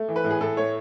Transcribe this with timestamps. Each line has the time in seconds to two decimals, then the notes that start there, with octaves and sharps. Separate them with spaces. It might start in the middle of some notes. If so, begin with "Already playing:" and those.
Already playing: A3
0.09 E3
0.16 B4
0.24 A2
0.30 G#4
0.41 A2 A4
0.57 A3 C#5